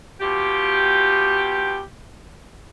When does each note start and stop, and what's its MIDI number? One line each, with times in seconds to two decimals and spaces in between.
0.21 1.80 47
0.21 1.80 65
0.21 1.80 67